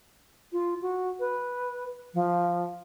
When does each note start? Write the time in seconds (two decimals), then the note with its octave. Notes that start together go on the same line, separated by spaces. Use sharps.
0.53 F4
0.82 F#4
1.20 B4
2.14 F3